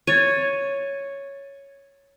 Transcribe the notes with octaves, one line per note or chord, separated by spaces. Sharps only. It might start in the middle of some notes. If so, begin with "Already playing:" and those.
C#5 G#6 A6 D#7